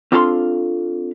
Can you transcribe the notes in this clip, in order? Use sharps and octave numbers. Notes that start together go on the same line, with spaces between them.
C4 D4 F4 A4 F5 C6